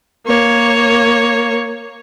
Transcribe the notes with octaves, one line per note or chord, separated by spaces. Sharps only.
A#3 C#5